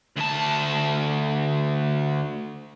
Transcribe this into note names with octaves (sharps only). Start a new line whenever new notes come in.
D2 A5